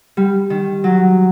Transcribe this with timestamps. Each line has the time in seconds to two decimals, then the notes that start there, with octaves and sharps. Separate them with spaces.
0.17 G3
0.50 D#3
0.84 F#3